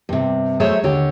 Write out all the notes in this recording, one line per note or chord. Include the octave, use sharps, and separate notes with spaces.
G2 C3
F#3 A3 G#4 C5 C#5 E5
D#2 D3 G4 C#5